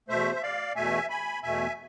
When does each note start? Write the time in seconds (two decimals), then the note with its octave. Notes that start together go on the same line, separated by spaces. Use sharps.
0.09 E2 B2 A3 C5 E5
0.35 E5
0.43 D5 F5
0.76 E2 B2 A3 E5 G#5
1.10 G#5 B5
1.43 E2 B2 A3 E5 G#5